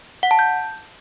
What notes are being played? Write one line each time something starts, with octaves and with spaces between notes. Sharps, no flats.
F#5
A5
G6